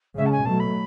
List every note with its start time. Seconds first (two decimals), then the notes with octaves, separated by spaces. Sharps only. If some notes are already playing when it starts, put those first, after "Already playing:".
0.17 C#3 G#3 C#4 E5
0.26 A5
0.32 G#5
0.45 B2 F#3 A3 A5
0.59 B5